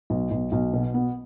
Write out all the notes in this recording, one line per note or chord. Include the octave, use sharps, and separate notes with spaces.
B1
B1
B1
B2
B3